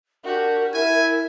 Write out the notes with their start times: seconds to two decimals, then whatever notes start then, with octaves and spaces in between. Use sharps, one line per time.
0.24 D4 F#4 G4 A#4
0.74 E4 E5 G#5